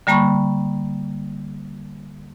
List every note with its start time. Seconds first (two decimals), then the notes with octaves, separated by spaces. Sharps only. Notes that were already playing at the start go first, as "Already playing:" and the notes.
0.07 D3 G3 A#3 A5 B5 C#6